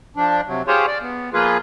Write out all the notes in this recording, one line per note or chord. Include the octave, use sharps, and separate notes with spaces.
F3 D4
C3 F#3
F4 G4 G#4 C5 C#5
D5
B3
F3 A#3 F4 G#4 B4